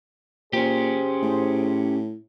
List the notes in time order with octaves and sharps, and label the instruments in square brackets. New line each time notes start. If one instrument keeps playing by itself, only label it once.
[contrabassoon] A#2 [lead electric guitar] C#4 G4 [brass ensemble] G#4 C5
[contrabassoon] A2